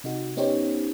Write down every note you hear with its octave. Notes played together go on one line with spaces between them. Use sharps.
C3 D#4 F#4
B3 C#4 D#4 G4 C5 C#5